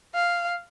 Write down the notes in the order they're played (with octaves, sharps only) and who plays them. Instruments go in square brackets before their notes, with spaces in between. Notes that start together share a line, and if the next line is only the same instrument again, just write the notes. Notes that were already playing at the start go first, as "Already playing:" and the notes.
[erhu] F5